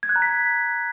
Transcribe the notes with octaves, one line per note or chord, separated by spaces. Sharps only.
G#6
F#6
A#5
B6